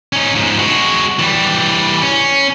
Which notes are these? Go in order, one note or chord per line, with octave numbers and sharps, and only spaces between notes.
C#4 D#4
G#2 F3
G#3 F#4
E3 G3
C#4